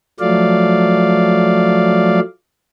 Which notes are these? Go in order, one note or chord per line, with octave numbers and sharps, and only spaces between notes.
F3 F#3 A3 D5 F5